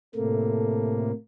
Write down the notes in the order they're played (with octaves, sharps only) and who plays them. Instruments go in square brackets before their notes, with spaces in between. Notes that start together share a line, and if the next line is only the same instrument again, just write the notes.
[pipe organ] A2 C3 A#3 [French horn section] A4